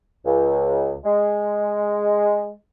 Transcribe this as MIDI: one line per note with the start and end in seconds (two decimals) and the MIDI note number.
0.25 0.93 37
1.04 2.51 56